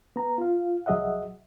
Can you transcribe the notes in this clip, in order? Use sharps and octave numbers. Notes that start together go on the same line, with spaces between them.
B3 A#5
F4 F5
C2 F#3 G#4 D#5 E5 F#5